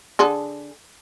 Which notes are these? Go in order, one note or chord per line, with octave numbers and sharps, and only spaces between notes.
D3 G#4 A4